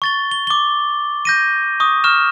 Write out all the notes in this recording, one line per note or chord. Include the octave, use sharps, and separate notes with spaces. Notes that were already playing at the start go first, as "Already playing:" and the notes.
C#6 A6 G7
G7
D6 G7
G6 A#6 D#7
C#6 D#6
C#6 F6 E7